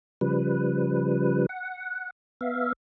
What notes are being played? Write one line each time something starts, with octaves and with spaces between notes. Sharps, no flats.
C#3 F3 G3 B4
F#5
B3 E5 F5